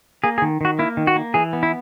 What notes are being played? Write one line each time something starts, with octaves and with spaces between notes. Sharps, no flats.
A#3 G#4
G#4
D#3
D#3 F#4
A#3 E4
D#3
F#4
A#3
E3 G#4
B3
E4